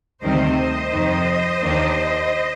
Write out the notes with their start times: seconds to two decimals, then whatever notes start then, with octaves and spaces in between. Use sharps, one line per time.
0.22 D2 C3 D#3 G3 C4 C5 D#5
0.92 F2 C3 D#3
1.61 D#2 D#3 A#3 D4